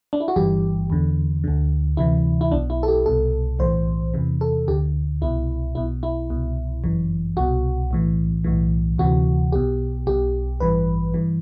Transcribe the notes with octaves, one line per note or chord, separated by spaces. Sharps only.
D4
E4
F#4
G1 G2 E3 G4
E2 D3
D2 D3
D2 C3 E3 E4
E4
B1 B2 D4
E4
A4
G4
C2 B2 A4
B1 A2 E3 C5
E2 C3 E3
A4
D2 D3 G4
C2 B2 E4
B1 B2 E4
E4
C2 B2
G1 F#2 E3
C2 B2 F#4
B1 A2 E3
B1 A2 E3
D2 C3 E3 F#4
B1 B2 G4
B1 B2 G4
A1 G2 E3 B4
G2 E3